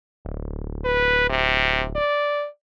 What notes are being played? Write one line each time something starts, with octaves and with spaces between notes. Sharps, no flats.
D1
B4
C3
D5